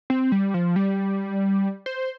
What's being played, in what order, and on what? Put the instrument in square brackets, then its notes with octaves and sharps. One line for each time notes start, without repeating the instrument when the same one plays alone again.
[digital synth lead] C4
G3
F3
G3
C5